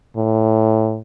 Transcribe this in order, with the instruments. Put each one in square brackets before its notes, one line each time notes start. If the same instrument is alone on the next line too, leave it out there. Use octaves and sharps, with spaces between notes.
[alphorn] A2